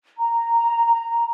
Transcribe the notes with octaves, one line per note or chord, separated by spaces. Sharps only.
A#5